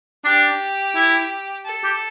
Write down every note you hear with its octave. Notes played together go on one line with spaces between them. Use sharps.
D4 G4
E4
A4
G4